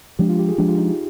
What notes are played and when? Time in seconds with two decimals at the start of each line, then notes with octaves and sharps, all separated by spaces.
0.19 F3 G#3 D4 G4
0.29 F4
0.39 G4
0.49 G#4
0.58 F3 G#3 D4 G4
0.68 F4
0.78 D#4